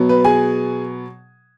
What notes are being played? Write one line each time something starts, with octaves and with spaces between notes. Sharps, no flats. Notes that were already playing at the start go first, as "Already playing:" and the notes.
Already playing: B2 F#3 B3
B4
G#4 G#5